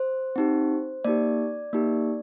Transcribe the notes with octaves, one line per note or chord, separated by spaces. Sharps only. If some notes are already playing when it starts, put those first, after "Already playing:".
Already playing: C5
C4 D#4 G4
A#3 D#4 G4 D5
A#3 D#4 G4